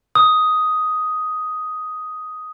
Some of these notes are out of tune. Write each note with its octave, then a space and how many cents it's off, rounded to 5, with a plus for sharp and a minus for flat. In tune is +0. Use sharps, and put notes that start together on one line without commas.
D#6 +5